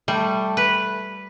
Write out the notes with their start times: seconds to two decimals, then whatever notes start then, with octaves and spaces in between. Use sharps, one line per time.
0.08 G3 A3
0.57 B4